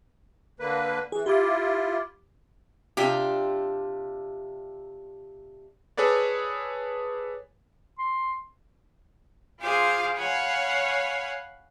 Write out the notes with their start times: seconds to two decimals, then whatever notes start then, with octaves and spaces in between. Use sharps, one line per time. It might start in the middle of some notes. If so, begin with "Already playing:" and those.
0.60 D3 A#3 B4
1.12 E3 G#4
1.26 E4 F4 G4 D6
2.97 C3 D4 F4 G4
5.97 G#4 A4 B4 C#5 D5
7.99 C6
9.61 F4 G#4 C5 F5 D6
10.17 C#5 F5 F#5 G#5 B5